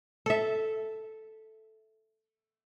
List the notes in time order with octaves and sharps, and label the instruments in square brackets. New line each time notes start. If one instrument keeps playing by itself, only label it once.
[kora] A4 E5